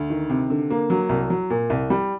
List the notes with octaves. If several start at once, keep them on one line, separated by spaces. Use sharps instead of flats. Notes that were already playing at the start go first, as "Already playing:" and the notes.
Already playing: D2
D#3
C3
D3
A#3
F#3
C2
F#3
A#2
C2
G3